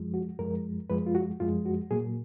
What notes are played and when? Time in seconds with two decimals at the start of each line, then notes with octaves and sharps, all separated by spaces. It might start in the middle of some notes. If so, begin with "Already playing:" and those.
Already playing: F#2 F3 G#3
0.14 F#4
0.38 F#2 F3 G#3 A#4
0.90 F#2 F3 G#3 B4
1.06 F4
1.15 F#4
1.40 F#2 F3 G#3 F4
1.66 F#4
1.91 A#2 F#3 A#3 G#4